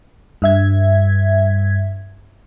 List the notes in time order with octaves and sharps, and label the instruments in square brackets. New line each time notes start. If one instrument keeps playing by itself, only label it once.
[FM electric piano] G2 E5 G#6